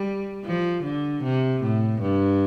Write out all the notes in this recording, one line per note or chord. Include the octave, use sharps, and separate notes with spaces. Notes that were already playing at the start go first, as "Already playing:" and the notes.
Already playing: G3
F3
D3
C3
A2
G2